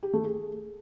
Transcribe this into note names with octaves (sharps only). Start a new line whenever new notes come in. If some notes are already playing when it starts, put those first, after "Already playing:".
G4
A3
G#4